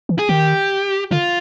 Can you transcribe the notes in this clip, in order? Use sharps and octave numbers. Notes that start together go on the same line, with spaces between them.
E3
G#4
D#3 G4
D3 F4